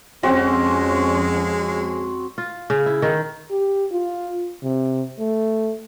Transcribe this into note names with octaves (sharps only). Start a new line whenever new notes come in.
F2 F3 G#3 C4 C#4 F#4 F#5
F4
C#3
E4
D#3
G4
F4
C3
A3